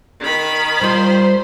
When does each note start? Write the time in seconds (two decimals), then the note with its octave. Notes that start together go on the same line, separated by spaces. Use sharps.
0.20 D#3 B5
0.81 G3 F4 C5